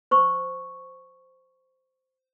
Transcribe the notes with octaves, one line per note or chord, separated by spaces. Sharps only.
C5 C#6